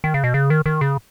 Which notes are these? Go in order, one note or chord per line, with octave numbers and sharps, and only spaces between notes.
D#3
C#3
B2
C#3
D#3
D#3
C#3